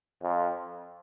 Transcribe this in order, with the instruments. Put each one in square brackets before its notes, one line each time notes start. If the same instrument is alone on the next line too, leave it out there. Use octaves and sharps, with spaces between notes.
[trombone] F2